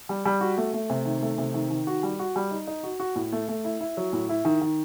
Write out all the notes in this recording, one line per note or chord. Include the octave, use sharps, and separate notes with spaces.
G3
G3
F#4
A3
A3
C3
D#3
A3
C3
D#3
D#3
F#4
G3
F#4
G3
D#4
D#4
F#4
F#4
A2
A3
A3
E4
E4
F#3
A2
E4
D#3
D#3